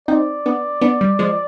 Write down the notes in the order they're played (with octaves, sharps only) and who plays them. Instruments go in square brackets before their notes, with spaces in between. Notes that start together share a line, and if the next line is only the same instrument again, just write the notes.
[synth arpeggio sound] C4 D#4 [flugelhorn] D5
[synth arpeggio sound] B3 D4
B3 D4
G3
F3 G#3